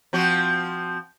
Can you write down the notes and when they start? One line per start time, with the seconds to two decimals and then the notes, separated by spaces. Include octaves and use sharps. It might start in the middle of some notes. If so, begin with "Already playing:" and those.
0.13 F3 C4 F#4